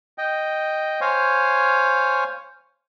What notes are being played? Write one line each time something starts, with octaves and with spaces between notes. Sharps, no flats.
D#5 G5
C5 C#5 F5 G#5